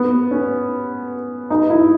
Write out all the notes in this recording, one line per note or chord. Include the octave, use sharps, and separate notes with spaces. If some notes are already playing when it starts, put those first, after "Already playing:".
Already playing: B3
C#4
D#4
E4